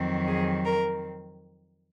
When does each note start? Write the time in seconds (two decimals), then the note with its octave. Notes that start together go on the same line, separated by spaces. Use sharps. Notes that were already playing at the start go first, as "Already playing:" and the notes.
Already playing: F2 D#3 F#3 C4
0.27 G#4
0.66 A#4